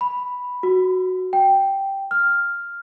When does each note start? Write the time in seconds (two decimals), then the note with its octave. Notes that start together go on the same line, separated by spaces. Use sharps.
0.01 B5
0.63 F#4
1.33 G5
2.11 F6